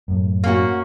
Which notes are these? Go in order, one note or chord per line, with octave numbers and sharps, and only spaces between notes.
F#2 A2
A#3 C#4 F#4